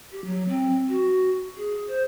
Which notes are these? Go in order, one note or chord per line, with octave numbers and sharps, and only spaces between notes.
G4
F#3
C4
F#4
G#4
C5